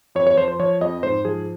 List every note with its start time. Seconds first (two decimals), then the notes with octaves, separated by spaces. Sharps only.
0.15 F2 C#5
0.27 C#5
0.37 F3 C5
0.48 C5
0.59 F3 C#5
0.81 F2 D#5
1.03 G#2 C5
1.25 F3 G#4